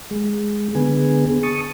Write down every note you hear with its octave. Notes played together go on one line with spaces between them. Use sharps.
G#3
D3 B3 G#4
A5 C#6 D#6